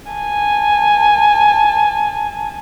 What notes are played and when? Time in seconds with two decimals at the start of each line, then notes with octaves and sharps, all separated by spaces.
0.12 G#5 A5